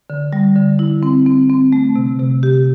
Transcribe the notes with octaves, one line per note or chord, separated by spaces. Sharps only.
D3
G3
D3
E4
C4
C4
C4
A3
C3
C3
G4